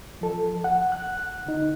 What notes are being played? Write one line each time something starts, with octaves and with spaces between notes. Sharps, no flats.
F3 A4
F#5
F#6
D3 D#4